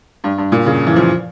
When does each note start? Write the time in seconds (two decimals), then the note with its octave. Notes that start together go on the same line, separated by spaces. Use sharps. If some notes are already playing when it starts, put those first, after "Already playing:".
0.24 G2
0.38 G2
0.52 A#2
0.66 C#3
0.86 E3
0.96 F3